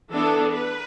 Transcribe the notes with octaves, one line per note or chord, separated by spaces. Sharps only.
E3 B3 D4 A4
B4